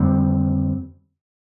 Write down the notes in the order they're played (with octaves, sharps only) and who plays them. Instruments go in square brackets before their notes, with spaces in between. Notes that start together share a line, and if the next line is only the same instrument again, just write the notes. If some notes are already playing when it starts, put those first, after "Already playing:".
Already playing: [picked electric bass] F2 D3 G3 C4